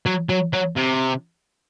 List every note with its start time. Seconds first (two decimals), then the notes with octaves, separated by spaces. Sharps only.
0.06 F#3
0.29 F#3
0.53 F#3
0.76 C3